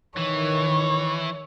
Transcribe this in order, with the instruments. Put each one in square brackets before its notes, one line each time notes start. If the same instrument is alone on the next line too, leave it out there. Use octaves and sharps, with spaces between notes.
[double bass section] D#3 [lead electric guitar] E3 [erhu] C#5